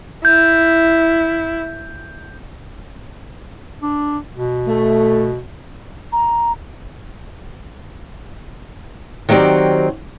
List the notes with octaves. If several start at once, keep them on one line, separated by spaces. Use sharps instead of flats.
E4 G6
D4
B2
A3
A#5
D#3 F#3 C4 G4 D5